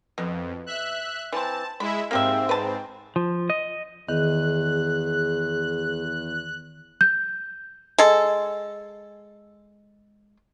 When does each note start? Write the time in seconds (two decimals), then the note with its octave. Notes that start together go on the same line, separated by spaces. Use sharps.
0.18 F2 B2
0.66 E5 F#6
1.33 E3 C4 A5
1.80 G#3 E4 E5 B5
2.11 G#2 A#3 C4 G4 E5
2.49 B4 A5
3.16 F3
3.50 D#5
4.09 E2 D#3 G#4 F#6
7.01 G6
7.98 G#3 A4